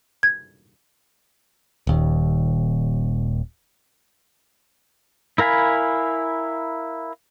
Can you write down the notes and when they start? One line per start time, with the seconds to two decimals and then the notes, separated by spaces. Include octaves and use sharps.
0.23 G#6
1.87 D#1 D#2
5.38 E4 A#4 F5 G#5 B5